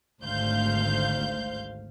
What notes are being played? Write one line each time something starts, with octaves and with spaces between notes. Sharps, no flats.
G#1 D2 G#2 C5 F5 G6